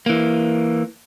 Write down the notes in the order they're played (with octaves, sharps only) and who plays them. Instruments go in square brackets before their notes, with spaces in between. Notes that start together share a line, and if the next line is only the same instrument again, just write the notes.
[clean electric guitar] E3 A#3